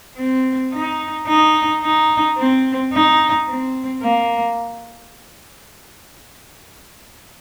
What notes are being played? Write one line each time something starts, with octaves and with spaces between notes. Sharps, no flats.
C4
D#4
D#4
D#4
C4
D#4
C4
A#3